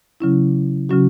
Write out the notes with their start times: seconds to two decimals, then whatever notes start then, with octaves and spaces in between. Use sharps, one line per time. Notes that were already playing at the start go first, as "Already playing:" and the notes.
0.20 C#3 F#3 C#4 E4
0.89 C#3 F#3 C#4 F#4